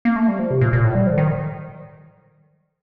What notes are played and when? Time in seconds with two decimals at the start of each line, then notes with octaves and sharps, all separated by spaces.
0.05 A#3
0.16 A3
0.28 G3
0.39 F3
0.50 C3
0.61 A#2
0.73 A#2
0.84 A2
0.95 G3
1.07 F3
1.13 D3
1.18 D#3